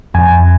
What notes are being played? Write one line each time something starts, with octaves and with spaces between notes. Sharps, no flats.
F2 G#5